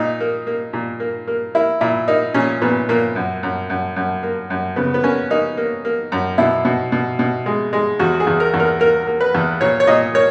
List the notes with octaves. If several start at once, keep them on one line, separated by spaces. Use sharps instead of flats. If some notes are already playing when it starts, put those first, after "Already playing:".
Already playing: A#2 D#4
A#3
A#3
A#2
A#3
A#3
A#3 E4
A#2 E4
A#3 D#4
A#2 C#4
A#2 B3
A#2 A#3
F#2
F#2
F#2
F#2
A#3
F#2
C#3 B3
B3
A#3 C#4
A#3 D#4
A#3
A#3
F#2
B2 E4
B2
B2
B2
G#3
G#3
E2 F#4
G#4
E2
A#4
E2
A#4
A#3 A#4
A#3
B4
E2
A#2 C#5
C#5
A#2 D#5
A#3 C#5